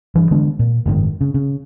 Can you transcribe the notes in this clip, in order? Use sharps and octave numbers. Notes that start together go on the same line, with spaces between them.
G2 E3
D3 G#3 B3 D4
A#2
F#1 G#2 C3 D#3
C#3
C#3